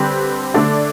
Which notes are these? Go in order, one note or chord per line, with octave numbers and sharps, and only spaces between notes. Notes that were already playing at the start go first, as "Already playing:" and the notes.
Already playing: D3 G3 C4 G4 B4
D3 A3 D4 A4 D5